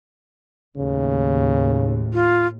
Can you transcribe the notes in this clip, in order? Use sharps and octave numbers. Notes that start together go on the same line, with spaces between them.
D#2 A2 C#3
F4